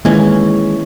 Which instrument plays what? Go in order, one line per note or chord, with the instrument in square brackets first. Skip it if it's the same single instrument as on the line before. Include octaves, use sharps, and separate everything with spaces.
[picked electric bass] D#3 A#3 [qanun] E3 C#4 [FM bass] G#3